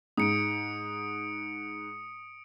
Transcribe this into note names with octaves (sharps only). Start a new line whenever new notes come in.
G#2 D#6 C#7 D7